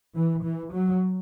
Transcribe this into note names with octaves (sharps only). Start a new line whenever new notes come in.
E3
E3
F#3